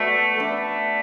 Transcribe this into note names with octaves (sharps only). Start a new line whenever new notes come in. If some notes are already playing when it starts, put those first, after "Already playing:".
Already playing: A3 B3 F#4 D5
A3 D4 B4 E5